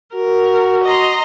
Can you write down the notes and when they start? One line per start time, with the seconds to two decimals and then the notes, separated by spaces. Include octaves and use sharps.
0.15 F#4 A#4
0.84 D#5 A#5 C6